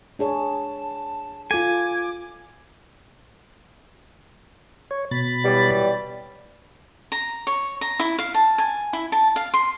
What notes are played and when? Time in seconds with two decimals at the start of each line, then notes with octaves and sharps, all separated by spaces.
0.19 D4 G#4 C#5 A5
1.51 F4 A4 G#5 D6
4.91 C#5
5.11 B2 B5 A6
5.45 E3 F#3 G3
7.12 A#5
7.47 C#5
7.81 A#5
8.00 E4
8.19 F5
8.34 A5
8.58 G#5
8.93 E4
9.12 A5
9.36 F5
9.54 C6